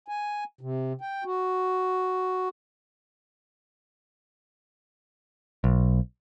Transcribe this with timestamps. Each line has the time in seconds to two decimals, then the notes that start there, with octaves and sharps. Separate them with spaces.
0.08 G#5
0.61 C3
1.01 G5
1.25 F#4
5.64 B1